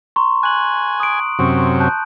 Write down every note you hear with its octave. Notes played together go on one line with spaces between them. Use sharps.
A#5 C6 C#6
G#5 F#6 F#7
D#6 D7
F#2 C3 C#4
A5 F#6 G6